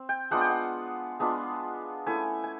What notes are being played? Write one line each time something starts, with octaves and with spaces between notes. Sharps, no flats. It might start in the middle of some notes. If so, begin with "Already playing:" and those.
Already playing: C4
G5
G#3 B3 D4 F4 F#5
G5
F#5
G#3 B3 D4 F4
A3 C#4 E4 G#5
G#5